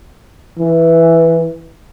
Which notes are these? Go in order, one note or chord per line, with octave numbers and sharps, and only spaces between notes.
E3